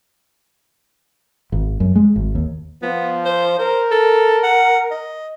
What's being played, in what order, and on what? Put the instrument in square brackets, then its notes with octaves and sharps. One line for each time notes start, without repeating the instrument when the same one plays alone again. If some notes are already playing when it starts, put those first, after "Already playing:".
[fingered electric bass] G#1
F#2
G#3
G#1
D#2
[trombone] F3 [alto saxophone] B3
[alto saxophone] C5
[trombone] A#4 [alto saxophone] C5
[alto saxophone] A4
F#5
D#5